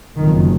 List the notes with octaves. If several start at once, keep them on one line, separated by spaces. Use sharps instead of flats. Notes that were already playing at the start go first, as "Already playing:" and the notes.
F#1 F2 D#3